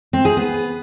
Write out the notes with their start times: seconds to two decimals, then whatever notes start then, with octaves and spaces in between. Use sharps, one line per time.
0.13 C4
0.25 G#4
0.37 B3